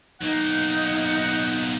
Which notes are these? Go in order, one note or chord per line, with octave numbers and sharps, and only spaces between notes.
B1 A#3 D#4 F#5